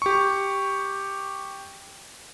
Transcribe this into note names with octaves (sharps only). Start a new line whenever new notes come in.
G4 C#6